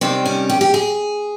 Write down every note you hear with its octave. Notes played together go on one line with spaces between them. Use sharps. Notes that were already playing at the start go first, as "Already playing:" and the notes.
C3 D#3 G3 C4
C#4
G4
G4
G#4